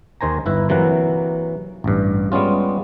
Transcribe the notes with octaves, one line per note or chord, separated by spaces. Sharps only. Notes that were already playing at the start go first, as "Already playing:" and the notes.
D#2 D#3 C5 G#5 A#5
G1 E4 B4
C3 E3 F#3 A#3 F#5
A1 G2
G3 G#3 B3 C#4 F4